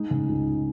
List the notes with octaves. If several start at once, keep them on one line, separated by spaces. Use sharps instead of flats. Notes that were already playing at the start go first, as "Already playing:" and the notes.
Already playing: G#3 D#4
C#3
C#2 D#4